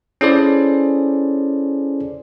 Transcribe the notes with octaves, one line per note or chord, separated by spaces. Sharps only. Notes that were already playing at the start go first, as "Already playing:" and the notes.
C#4 E4 G#4 A4 C5 D5